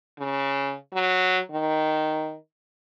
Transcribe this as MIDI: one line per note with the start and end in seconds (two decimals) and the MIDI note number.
0.19 0.74 49
0.93 1.39 54
1.51 2.36 51